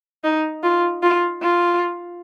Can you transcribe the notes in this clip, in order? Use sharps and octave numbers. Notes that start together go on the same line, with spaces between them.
D#4
F4
F4
F4